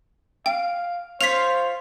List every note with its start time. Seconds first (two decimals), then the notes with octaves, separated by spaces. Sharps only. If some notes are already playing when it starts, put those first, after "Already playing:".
0.46 F5 G5
1.21 F4 C5 C#5 F5 B6 F7